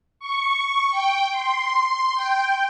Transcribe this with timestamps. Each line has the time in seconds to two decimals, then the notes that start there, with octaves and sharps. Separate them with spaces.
0.20 C#6
0.90 G5
1.31 C6
2.15 G5